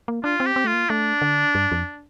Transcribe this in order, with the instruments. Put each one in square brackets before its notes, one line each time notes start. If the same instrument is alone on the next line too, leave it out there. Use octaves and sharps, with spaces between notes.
[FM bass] A#3
[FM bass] D4 [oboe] F4
[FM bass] C4
[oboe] G4
[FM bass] C4
[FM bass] A3 [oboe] F4
[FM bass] A#3
[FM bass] A3 [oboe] D4
[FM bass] D3
G2
F2